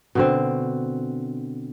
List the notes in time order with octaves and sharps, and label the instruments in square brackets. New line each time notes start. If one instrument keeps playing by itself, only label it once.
[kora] B2 D3 C4